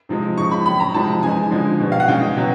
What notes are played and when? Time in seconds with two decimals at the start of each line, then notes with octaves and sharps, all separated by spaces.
0.09 C3 F3 G#3
0.37 C#3 F3 G#3 C#6
0.51 B5
0.66 A2 F#3 B5
0.80 A#5
0.94 C3 F3 G#3 A5
1.23 C#3 E3 G#3 G#5
1.51 D3 F3 G#3
1.80 B2 G3
1.92 F5
2.00 F#5
2.08 C#3 E3 G#3 G5
2.37 B2 F#3